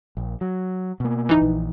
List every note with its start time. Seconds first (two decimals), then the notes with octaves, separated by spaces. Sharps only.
0.17 A#1
0.41 F#3
1.00 B2 A#3
1.29 D1 E3 D#4
1.42 A#1